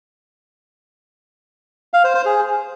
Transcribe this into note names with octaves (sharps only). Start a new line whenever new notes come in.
F5
C5
C5
G#4